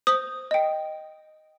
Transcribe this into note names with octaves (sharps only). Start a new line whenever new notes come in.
C5 D#6
D#5 G5